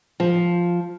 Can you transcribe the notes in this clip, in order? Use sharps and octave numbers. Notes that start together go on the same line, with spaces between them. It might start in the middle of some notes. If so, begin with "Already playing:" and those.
F3